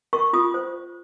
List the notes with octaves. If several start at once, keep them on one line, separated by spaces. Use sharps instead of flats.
A#4 C#6
F4 D#6
C5